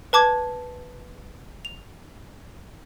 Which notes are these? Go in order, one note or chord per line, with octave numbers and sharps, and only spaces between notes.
B4 A5 D6 G#6
F7